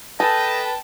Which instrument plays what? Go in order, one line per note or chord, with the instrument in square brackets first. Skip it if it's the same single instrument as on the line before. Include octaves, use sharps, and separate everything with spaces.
[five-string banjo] G#4 A4 [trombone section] B4 [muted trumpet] D#5 [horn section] G5 A5